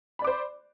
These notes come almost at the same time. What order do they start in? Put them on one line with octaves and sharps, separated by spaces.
B5 D5 D6 C5